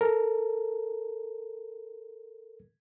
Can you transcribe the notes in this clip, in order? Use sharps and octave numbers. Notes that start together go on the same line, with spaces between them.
A4 A#4